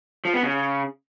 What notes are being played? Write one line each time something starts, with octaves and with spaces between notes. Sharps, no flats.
F3
B3
C#3